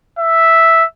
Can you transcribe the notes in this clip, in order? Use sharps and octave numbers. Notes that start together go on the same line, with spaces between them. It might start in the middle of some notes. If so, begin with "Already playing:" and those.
E5